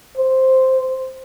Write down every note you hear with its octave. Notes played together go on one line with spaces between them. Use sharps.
C5